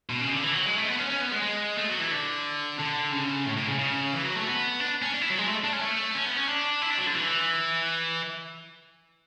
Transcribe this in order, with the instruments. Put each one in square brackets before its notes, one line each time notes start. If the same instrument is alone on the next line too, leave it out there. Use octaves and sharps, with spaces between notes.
[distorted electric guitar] B2
C#3
D3
E3
F#3
G#3
A3
B3
C#4
C#4
B3
G#3
G#3
A3
F#3
E3
D3
D3
C#3
A2
A2
C#3
C#3
E3
F#3
A3
B3
D4
C#4
D4
E4
F#3
G#3
A3
D4
C#4
A3
C#4
B3
C#4
D4
E4
D4
F#3
D3
E3